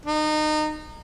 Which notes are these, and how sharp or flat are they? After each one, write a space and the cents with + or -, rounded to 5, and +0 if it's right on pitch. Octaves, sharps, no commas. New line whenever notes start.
D#4 -25